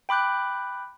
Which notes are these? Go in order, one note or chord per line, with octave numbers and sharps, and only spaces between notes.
G5 B5 D6 F#6 G6